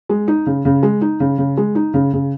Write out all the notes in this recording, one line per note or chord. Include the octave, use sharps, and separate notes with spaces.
G#3
D#4
C#3
C#3
G#3
D#4
C#3
C#3
G#3
D#4
C#3
C#3